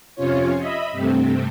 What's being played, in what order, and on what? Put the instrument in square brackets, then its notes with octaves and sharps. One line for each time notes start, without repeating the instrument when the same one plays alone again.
[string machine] F2 C3 C#4 F4 C#5
D#5 E5 B5
G2 C3 A3 C4